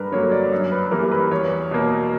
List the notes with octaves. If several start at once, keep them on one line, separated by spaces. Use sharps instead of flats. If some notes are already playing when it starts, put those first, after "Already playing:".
Already playing: G2 A#4 B4
D3 F#3 A#3 C#5
D5
F#2
B4
E3 G3 A#3 A#4
B4
E2 C#5
B2 A#3